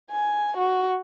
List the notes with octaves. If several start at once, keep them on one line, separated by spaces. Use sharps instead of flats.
G#5
F#4